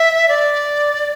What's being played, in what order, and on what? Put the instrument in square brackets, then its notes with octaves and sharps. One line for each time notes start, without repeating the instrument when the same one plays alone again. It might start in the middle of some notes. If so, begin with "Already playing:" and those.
Already playing: [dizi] E5
D5